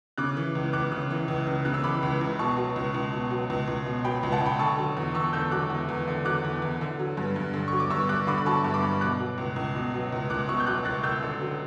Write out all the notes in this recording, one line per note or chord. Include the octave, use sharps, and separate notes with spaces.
C#3 D6 F#6
E3
C#2
C#2 D6 F#6
C#3
E3
C#2
C#2
C#3 F#6
E6
E3 B5 D6
C#2
C#2
B2 A5 C#6
F#3
C#2
C#2
B2
F#3
C#2
C#2
B2
F#3 G5 B5
C#2
F#5 A5
C#2 G5 B5
D3 A5 C#6
F#3
E2
E2 C#6 E6
D3 E6 G6
F#3 D6 F#6
E2
E2
D3
F#3 D6 F#6
E2
E2
D3
F#3
G2
G2
D3
F#3 C#6
D6
G2 C#6 E6
G2 D6 F#6
D3 B5 D6
B5
F#3 A5 C#6
G2
B5 D6
G2
B2 D6 F#6
F#3
C#2
C#2
B2
F#3
C#2
C#2 D6 F#6
B2 C#6 E6
G6
F#3 D6 F#6
C#2 F#6 A6
C#2 E6 G6
D3
F#3